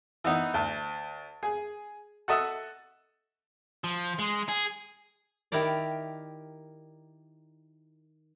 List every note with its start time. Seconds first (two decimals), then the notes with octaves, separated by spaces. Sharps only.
0.24 E3 B3 D#4
0.54 D2
1.43 G#4
2.28 F#4 A4 D#5 E5
3.84 F3
4.19 G#3
4.49 G#4
5.52 D#3 E4 G4 A#4 D5